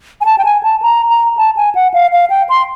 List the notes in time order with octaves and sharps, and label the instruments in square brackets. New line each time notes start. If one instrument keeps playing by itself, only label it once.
[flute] G#5
A5
G5
G#5
A5
A#5
A#5
A5
G#5
F#5
F5
F5
G5
C6